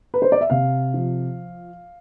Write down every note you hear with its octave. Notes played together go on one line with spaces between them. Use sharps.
B4
C5
D5
E5
C3 F5
F3